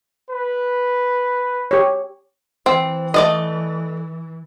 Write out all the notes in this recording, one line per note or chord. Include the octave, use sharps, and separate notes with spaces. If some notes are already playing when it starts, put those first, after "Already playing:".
B4
G4 C#5
E3 C4
A3 D5 D#5